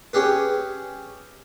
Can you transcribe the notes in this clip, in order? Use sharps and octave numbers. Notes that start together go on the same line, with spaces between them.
C#4 G4 G#4 B4